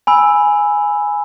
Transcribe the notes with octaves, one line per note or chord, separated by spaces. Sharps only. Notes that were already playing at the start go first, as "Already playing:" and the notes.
G#5 B5 E6